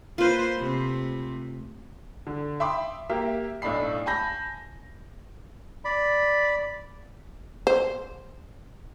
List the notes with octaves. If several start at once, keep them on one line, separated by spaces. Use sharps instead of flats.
A#3 F4 B4 C5
C3 A3
D3
E5 G5 B5 C6 D6 D#6
A#3 G4 A#4 E5
B1 A2 D4 D5 B5 C7
G#5 A5 B5 G6 A#6
D5 B5
C5